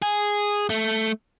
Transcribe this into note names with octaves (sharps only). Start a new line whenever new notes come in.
G#4
A3